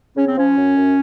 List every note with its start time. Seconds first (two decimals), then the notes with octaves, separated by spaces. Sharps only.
0.16 C#3 C#4
0.27 C4
0.36 F3 C#4
0.56 F#2
0.76 F#2